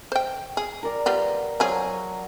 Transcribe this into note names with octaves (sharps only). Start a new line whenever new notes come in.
C5 G5
G#4
A#4 D5
G3 B3 F4
F3 F#3 G#4